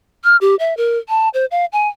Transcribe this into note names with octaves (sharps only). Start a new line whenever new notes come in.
F6
G4
E5
A#4
A5
C5
F5
G#5